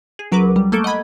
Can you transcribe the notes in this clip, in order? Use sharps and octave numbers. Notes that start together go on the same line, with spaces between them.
G#4
C#2 F#3 A#4 B4 D6
G3
A3 A#3 A4 D7
D#5 F#5 B5 G#6